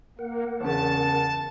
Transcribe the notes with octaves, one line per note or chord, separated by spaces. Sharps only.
A#3 A#4 F#5
E2 C#3 A5